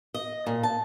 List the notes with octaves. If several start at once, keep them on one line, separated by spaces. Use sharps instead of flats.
D#5
A#2
A5